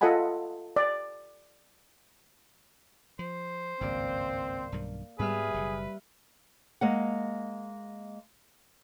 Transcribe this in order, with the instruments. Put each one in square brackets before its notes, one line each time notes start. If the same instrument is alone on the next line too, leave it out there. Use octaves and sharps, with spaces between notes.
[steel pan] F4 A4 D#5 F#5 G#5 B5
D5
[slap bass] F3 [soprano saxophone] C5
[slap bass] G#1 C#2 G2 [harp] A#3 D5 [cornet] C4
[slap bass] B1 G2 D#3
[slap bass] G#2 B3 [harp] G3 E5 F6 [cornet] G#4 [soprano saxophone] B4
[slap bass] F#1 B2
[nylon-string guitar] G#3 A#3 F#5